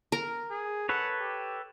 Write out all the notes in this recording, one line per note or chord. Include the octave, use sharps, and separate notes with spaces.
A#4
G#4
A4 B4 C#5 F#5
G4